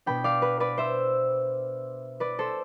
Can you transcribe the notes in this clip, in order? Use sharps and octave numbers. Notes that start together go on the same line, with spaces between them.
B2 B3 D4 G5 B5
D5 F5
B4
B4 D5
C5 E5
B4 D5
A4 C5